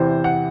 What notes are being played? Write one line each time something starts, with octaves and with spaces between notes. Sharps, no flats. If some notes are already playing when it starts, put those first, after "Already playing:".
Already playing: E2 C3 E3 C5
F#5